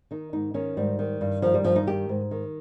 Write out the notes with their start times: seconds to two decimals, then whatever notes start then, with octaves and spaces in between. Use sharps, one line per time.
0.11 D#3 D#4
0.33 G#2 D#4
0.54 D#3 C#4
0.77 G#2 G3
0.99 D#3
1.21 G2
1.42 D#3 F3
1.54 G3
1.64 G2 F3
1.76 D#4
1.87 D#3 G4
2.09 G#2
2.31 D#3